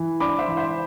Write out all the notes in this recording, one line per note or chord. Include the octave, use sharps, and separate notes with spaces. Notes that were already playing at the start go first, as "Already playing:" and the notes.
Already playing: E3
D4 B5 D6
C5 E5
E3
C5 E5